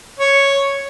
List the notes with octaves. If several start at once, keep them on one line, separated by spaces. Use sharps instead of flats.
C#5